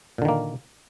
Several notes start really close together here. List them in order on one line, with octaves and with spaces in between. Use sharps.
A#2 D3 D#3 A#3